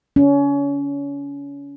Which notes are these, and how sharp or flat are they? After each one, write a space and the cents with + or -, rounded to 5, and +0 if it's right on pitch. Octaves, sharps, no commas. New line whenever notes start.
C#4 +30